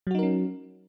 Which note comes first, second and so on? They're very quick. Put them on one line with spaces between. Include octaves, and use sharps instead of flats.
F#3 F#4 D#4 A#4 C#4